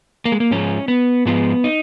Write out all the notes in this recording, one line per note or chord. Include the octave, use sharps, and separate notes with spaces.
A#3
G#3
A#3
G#2 F3 G#3 C#4
B3
G#2 F3 G#3 B3
D#4